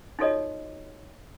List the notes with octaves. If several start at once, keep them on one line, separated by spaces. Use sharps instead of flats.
D#4 F4 F#4 A4 C#5 D#5